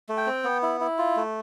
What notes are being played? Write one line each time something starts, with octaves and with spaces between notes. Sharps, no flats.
A3
G5
C4
B3
E4
E4
F4
A3